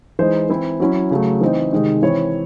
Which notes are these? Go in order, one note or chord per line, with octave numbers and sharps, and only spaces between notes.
E3 G#3 D#4 C5
E3 C4 E4
F#3 C#4 E4
C#3 F#3 A3
E3 C4 D#4
C3 D#3 G#3 D#4
E3 C4 E4 C#5